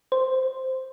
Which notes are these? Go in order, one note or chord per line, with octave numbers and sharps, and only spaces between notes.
C5